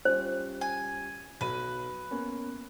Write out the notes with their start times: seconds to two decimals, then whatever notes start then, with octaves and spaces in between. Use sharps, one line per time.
0.05 G3 C#4 F4 C5
0.61 G#5
1.41 B1 F#3 B4 D#7
2.11 A#3 B3 C#4